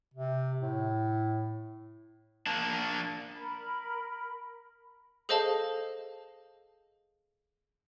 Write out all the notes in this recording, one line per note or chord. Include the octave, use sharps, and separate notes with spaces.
C3
A2
A#3 D4
A#4 B5
G#4 A4 C5 D#5 F5 A5